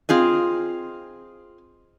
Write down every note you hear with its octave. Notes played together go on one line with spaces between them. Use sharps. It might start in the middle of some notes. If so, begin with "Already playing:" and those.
C4 F4 G#4 D#5